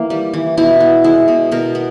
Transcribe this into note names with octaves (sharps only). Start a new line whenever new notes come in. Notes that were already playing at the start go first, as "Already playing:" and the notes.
Already playing: E3 A#3
G3
E3
B2 E4
B3
G#3 E4
B2
B2 A#4
B3